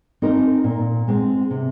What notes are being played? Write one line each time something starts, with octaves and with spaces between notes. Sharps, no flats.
C4 D#4 A#4 D#5
A#2
G#3 C4
C3